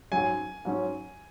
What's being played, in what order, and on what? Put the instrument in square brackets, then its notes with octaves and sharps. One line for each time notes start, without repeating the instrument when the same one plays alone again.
[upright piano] G#2 F#3 C#4 [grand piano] G#5
[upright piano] G#2 F#3 C#4